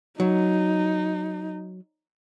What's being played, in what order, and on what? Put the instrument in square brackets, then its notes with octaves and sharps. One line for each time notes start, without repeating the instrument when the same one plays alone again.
[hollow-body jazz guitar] F#3 [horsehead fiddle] D#4